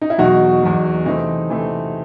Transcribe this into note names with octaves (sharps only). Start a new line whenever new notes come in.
D#4
E4
E2 B2 F#3 D#4 F#4
E2 B2 F#3
C3 E3 A3 C4 D#4
C3 E3 A3 C4